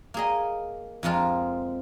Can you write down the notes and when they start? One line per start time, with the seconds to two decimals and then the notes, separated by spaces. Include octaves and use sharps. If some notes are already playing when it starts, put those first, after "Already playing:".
0.14 A#3 G#4 D#5
1.03 F2 F3 G#3 F4 A#4